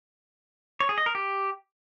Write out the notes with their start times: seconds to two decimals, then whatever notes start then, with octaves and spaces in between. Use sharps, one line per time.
0.80 C#5
0.89 G#4
0.98 D#5
1.06 A#4
1.15 G4